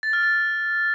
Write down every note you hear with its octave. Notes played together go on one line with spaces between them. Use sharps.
A6
F6
A6